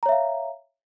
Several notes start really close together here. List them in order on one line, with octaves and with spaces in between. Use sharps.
A#5 C#5 E5 F5